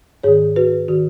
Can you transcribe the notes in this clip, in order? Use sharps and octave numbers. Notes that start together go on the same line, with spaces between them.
G#2 D#3 G#4 C#5
F#4 B4
D#3 F#4